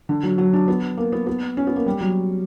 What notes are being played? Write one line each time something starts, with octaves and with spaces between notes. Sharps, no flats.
D3
F#3
F#3
D4
B3
A#3
B3
B3
C#4
B3
A#3
G3
F#3